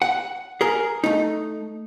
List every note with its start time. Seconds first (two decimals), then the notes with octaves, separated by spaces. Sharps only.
0.02 F#5
0.61 G#4 A#4
1.04 A3 D#4